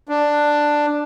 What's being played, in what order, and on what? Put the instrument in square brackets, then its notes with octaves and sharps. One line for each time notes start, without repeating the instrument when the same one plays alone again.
[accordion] D4